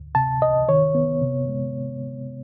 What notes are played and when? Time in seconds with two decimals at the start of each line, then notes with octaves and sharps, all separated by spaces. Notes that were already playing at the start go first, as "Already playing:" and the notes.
Already playing: D2
0.15 C3 A5
0.42 C2 D#5
0.69 D#3 C#5
0.95 B3
1.22 C3
1.48 G#3